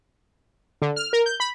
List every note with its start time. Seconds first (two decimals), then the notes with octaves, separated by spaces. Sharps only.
0.82 D3
0.96 F6
1.13 A#4
1.26 G6
1.40 B5